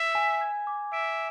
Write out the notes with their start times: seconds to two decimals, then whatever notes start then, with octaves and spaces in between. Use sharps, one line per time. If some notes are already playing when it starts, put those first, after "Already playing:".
Already playing: E5
0.15 G#5
0.41 G#6
0.67 D6
0.93 E5 D7